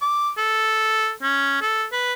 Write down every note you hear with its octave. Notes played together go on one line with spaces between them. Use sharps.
D6
A4
C#4
A4
B4